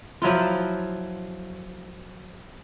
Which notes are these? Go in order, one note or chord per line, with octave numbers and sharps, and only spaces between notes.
F3 F#3 E4 F4